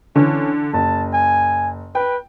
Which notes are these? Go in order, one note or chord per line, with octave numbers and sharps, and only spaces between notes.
D3 E3 C#4
F#1 A5
G#5
B4 G5